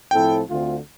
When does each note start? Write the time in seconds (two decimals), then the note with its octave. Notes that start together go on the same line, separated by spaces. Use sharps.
0.11 A2 F3 C4 E4 A4 G5
0.48 D2 D3 A3 C4 F4